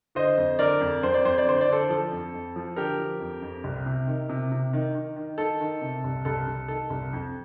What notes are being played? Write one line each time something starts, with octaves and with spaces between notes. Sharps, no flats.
D3 C5 D#5
F2
D3 A#4 D5
F2
F2 C5
D5
F2 C5
D5
D3 C5
D5
D3 A4 C5
F3 A4
F2
F2
F3
D3 G4 A#4
F3
F2
F2
C2
C3
D#3
C3
C3
D#3
D#3
D#3
D#3 A4
D#3
C3
C2
C2 A4
C2
D#3 A4
C2
F2